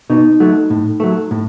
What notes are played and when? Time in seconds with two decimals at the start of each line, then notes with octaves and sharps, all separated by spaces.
0.10 B2 D#4
0.40 F#3 A3
0.70 A2
1.00 F#3 A3
1.31 A2